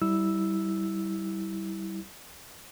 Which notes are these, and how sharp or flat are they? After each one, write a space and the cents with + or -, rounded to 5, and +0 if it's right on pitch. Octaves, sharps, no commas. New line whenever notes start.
G3 -20 E4 -20 E6 +0